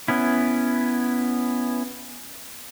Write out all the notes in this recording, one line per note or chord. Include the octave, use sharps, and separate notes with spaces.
B3 C#4 E4